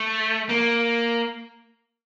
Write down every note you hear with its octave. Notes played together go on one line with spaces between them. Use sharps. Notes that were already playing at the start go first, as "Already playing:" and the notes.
Already playing: A3
A#3